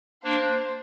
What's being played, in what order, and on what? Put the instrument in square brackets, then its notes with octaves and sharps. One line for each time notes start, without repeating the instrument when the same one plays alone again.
[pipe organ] A#3 D4 [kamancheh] C5